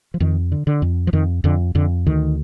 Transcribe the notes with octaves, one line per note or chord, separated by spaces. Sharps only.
F3
F2 D#3
D3
D3
F2
F3
F2 D#3
F2 D3
F2 D3
D2 D#3